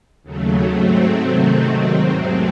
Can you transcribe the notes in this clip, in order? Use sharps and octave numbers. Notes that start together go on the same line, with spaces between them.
D#2 C#3 F#3 A3
G#2 F#3 A3 C4
C3 D#3 F#3 A3
G#2 D#3 F#3 C4
E2 C3 F#3 A3